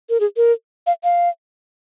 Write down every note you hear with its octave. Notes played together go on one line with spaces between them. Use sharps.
A#4
G#4
A#4
F5
F5